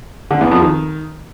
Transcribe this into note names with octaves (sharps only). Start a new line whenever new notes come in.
D3
E2
F2
D#3